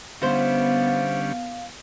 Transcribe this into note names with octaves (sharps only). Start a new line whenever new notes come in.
D3 G3 B3 C#4 E4 C5 F5